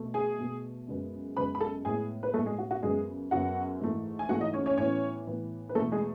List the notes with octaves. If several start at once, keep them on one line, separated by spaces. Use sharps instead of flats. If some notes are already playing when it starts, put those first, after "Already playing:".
Already playing: B2 A3
G#4 G#5
B2 A3
F#2 C#3 G#3 B3
F#2 C#3 G#3 B3 B4 B5
B5
A4 A5
A2 G#3 B3 G#4 G#5
B4
A2 G#3 A3 B3 A4
G#3 G#4
F#4
F#4
F#2 C#3 F#3 G#3 B3 G#4
F#2 C#3 F#3 B3 F#4 F#5
G#2 E3 A3
G#5
G#2 E3 A3 F#4 F#5
D#4 D#5
C#4 C#5
C#4 C#5
A2 E3 B3 C#4 C#5
A2 E3 B3
B4
E2 B2 A3 A4
G#3 G#4